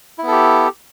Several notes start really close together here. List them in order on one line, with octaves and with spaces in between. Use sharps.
E4 B3 A4 G4